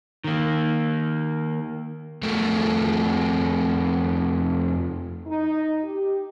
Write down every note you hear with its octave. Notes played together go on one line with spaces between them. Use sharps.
D#3 A#3
F2 A3 A4 A#4
D#4
G4